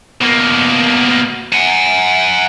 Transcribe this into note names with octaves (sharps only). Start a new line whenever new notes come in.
B2 A#3
F#5 G#5